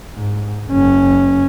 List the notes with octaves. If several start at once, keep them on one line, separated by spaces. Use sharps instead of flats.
G#2
F#1 C#4